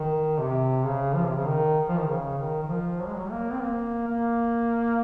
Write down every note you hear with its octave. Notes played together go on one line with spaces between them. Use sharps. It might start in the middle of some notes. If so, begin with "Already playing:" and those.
Already playing: D#3
C3
C#3
F3
C3
C#3
D#3
F3
D#3
C#3
D#3
D#3
F3
F#3
G#3
F#3
A#3
C4
A#3
A#3